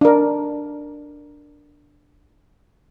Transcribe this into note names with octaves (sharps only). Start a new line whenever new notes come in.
D4 A#4